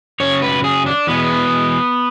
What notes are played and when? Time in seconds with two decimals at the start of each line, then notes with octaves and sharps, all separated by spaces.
0.20 F#2 C#3 F#3 C#5
0.42 B4
0.64 G#4
0.86 D4
1.07 E2 B2 G#3 B3